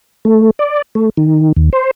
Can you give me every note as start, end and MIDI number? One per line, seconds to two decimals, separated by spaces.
0.25 0.50 57
0.59 0.82 74
0.95 1.10 57
1.17 1.52 51
1.56 1.70 39
1.73 1.91 72